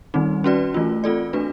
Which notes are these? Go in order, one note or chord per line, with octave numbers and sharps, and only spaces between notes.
D#3 G3 C4 D#4
C#4 F#4 B4 D5
E3 A3 C#4 F4
C4 F4 A4 D5
A3 D4 F#4 B4